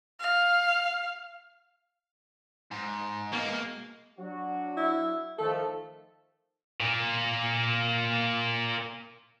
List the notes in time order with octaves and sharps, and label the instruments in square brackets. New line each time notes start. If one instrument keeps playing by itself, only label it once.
[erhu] F5
[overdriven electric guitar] G#2
[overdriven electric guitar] B2 G#3 [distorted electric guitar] A#3
[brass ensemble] F#3 D4 F#4
[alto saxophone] E4
[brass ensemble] D#3 F3 A3 [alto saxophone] A4
[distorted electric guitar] A#2 A#3